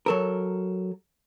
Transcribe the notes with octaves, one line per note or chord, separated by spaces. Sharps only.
F#3 A4 A#4